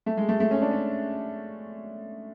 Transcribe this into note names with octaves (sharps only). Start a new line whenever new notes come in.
A3
G#3
A3
A3
C#4
D4
C#4